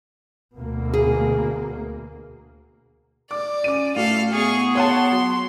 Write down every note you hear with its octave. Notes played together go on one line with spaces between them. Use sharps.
D2 B2 A#3
G#4
D5 D6
C#4 D6 D#7
A2 F#4 A4 F5
B3 G#4 C#6
C#5 F#5 A5 C6
F#3